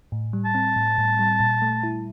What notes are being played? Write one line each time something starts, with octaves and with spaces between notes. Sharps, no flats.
A2
G3
A5
C4
A2
A2
G3
A#2
A3
E4